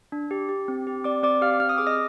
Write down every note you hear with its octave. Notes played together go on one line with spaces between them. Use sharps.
D4
G4
G4
C4
G4
C4 D5 D6
C4 D5 D6
G4 F5 F6
C4 F6
D#6
G#4 D6
D#5 D#6